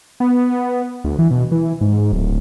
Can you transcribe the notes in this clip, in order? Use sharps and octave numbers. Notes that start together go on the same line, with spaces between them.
B3
D2
E3
B2
E3
G#2
D1